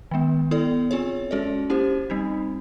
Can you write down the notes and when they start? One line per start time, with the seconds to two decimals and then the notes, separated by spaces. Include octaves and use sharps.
0.11 D#3 G#3 B3
0.51 B3 E4 A4 D5
0.91 C4 F4 G#4 C#5
1.31 G#3 C#4 F#4 A4 D5
1.70 A#3 C#4 E4 G4 C5
2.10 G3 C4 D#4